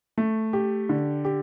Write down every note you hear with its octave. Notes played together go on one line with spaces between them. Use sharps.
A3
G4
D3
G4